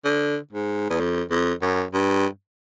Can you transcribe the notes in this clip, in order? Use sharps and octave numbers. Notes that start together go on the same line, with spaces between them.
D3
G#2
E2
F2
F2
F#2
G2